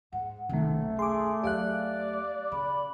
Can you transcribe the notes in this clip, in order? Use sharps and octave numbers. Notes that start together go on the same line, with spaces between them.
G#2 F#5
F#1 B1 C3 D#3 A3
G#4 C6 D6
E2 F#3 G4 D5 F5 F#6
C#3 B5